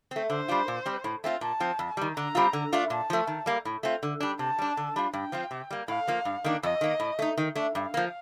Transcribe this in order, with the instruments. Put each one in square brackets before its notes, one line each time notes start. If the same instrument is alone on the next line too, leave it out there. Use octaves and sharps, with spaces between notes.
[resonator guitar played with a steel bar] A3 C4
[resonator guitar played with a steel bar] D3 [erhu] C5
[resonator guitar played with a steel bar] G3 D4 F4
A#2
G3 C4
A2
A3 C4 F4
[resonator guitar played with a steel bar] A#2 [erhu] A5
[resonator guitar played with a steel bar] F3 C4
F2
D#3 G3
[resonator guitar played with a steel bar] D3 [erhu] A#5
[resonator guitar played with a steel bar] G3 C4 F4
D3
A3 D4 F4
[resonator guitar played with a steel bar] A#2 [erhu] A5
[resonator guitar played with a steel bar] F3 A3
D#3
G3 A#3
A2
A3 C4 F4
D3
G3 D4
[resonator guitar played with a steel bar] C3 [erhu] A5
[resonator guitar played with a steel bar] G3 D4
D3
G3 D4 F4
[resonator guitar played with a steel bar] G2 [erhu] G5
[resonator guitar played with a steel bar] F3 C4 F4
C3
G3 A#3
[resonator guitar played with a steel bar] A2 [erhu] F5
[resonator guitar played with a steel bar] F3 A#3 F4
G2
D#3 A#3 D4
[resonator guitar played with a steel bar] F2 [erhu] D#5
[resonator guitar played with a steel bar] D#3 A#3
A2
A3 D#4
D#3
A3 D4
[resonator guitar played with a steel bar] G2 [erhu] F5
[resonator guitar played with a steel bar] F3 A#3